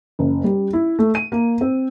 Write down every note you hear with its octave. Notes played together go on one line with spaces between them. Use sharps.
F#1
G3
E4
A3
D#7
A#3
C4